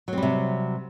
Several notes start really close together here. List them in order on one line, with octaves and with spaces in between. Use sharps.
F#3 C4 G3 C3